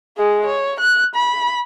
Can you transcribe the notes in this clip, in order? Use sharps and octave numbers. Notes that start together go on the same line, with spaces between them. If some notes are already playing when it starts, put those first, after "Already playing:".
G#3 G#4
C#5
F#6
B5